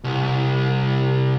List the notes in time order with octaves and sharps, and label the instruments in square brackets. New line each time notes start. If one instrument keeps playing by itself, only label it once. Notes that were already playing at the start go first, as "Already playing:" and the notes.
[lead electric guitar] C2